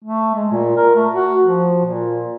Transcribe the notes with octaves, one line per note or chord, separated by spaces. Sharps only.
A3
G#3
A#2
A#4
A3
F#4
F3
A#2